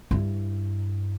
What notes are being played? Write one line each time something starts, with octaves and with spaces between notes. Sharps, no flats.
G2 E4